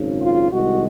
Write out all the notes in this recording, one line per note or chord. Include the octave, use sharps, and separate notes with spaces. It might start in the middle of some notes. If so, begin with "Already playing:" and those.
Already playing: G#1 F#2 C#3
F4
C2 C3 D#3 G#3 F#4